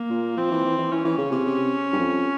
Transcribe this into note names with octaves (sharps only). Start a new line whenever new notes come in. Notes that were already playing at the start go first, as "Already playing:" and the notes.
Already playing: A#3
A#2
F3 C4
E3
E3
E3
E3 C#4
E3
C#3
C3
C3
G2
F2